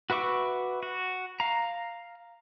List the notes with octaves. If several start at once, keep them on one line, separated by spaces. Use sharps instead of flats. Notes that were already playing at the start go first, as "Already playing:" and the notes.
F#4 B4 E5 C#6 D6
F#4
F5 A#5